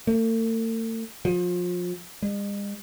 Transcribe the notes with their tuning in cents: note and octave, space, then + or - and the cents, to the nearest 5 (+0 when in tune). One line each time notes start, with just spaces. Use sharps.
A3 +45
F3 +30
G#3 -45